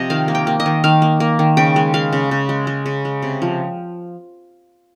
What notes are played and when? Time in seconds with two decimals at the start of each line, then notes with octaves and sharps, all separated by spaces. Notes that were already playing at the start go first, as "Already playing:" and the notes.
Already playing: C3 F3 D#5
0.10 D#3 F5
0.28 A#3
0.35 G5
0.47 A#3
0.60 D#5
0.66 D#3
0.84 D#3 F5
1.02 A#3
1.20 A#3
1.39 D#3
1.57 C#3 G5
1.76 G#3
1.94 G#3 F5
2.13 C#3
2.31 C#3
2.49 G#3
2.67 G#3
2.86 C#3
3.05 G#3
3.22 C3
3.42 F3